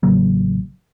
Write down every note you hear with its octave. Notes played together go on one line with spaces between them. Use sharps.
A1 C#3 F#3 A#3